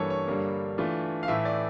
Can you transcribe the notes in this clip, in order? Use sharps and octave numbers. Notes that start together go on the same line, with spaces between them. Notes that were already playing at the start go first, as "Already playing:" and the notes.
Already playing: G2 E3 G3 A#3 A4 C#5
C#5
G2 D3 G3 A#3
E3 A3 D4 F4
F5
A2 E3 A3 E5
D5